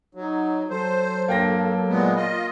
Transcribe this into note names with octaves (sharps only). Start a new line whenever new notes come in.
F#3 D#4
F#3 A4 C5
G2 F#3 A#3 G5 A#6
A#2 G#3 B3
F4 D#5